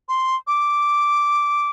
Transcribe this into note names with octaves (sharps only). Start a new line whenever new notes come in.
C6
D6